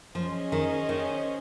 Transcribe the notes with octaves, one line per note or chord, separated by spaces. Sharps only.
F3 C#4 G#4 C5 D#5
D#3
D#3